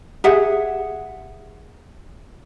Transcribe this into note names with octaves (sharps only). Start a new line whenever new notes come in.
G4 G#4 E5 F#5